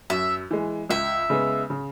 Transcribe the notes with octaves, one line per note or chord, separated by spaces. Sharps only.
F#2 E5
E3 G#3
C#2 E5
C#3 G#3 B3
C#3